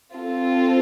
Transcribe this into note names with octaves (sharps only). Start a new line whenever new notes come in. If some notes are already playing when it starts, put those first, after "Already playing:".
C4 F4 A4